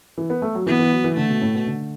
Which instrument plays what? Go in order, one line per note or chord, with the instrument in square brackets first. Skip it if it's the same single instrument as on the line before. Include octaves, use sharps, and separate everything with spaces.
[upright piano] E3
B3
A3
F#3
[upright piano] E3 [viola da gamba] B3
[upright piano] E3
F#3
E3
[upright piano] D3 [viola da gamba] A3
[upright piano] B2
A2
B2
D3